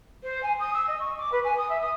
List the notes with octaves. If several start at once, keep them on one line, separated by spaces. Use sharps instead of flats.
C5
G#5
D#6
E6
D#5
C#6
D6
B4
G#5
D#6
E5
D#6